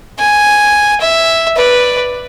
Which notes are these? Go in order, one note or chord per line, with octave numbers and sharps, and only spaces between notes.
G#5
E5
B4 D5